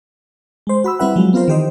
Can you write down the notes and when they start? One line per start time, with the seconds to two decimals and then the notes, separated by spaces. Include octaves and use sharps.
0.67 G#3 C5
0.84 F#4 B5 E6
0.99 G3 C4 E4 B4 E5 F#5
1.16 F3 F#3 G#3
1.33 B3 C4 F4 A#4 C5
1.48 D#3 E3 G4 C5 D#5